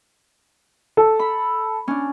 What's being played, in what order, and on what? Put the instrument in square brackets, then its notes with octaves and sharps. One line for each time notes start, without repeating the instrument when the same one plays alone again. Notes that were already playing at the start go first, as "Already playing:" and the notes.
[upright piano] A4
[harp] B5
C#4 D4